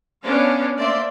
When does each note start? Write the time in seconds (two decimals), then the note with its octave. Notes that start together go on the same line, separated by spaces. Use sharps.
0.23 B3 C#4 D4 F5
0.75 A3 A#3 C5 D5 E5 C6